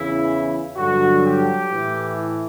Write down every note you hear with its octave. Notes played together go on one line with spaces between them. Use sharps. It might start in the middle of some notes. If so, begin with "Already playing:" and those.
Already playing: E2 C#3 E3 E4
G2 D3 F#3 F#4
G4
A2 E3